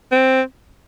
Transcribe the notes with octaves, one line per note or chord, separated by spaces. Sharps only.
C4